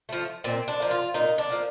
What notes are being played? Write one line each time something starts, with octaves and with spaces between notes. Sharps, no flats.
F3 A3
A#2 C4
D4
F3 A#3
F4
A#2 D#4
D4
F3 A#3